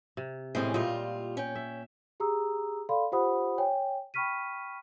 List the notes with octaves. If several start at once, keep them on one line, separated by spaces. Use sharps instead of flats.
C3
A2 E3 G#3 C4 C#4 G5
A#2 G3 F4 D#5
C#4 G5
E5
G4 G#4 A#5 D#6 E6
A4 D5 F5 B5 C6
F4 G4 C5 F#5 B5 D#6
C#5 G5 G#5
G5 B5 C#6 F6 B6 D#7